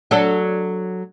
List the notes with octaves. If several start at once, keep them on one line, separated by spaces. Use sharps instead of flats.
F#3 D4 A4